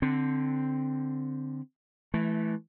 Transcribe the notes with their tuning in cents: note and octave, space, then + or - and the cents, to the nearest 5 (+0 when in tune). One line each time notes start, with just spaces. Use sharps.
D3 +0 C4 +0
E3 +0 A3 -25